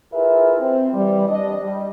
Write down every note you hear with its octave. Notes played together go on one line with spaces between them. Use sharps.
E4 F4 G#4 A#4 B4 E5
C4
E3 G3
D4 D#5
G3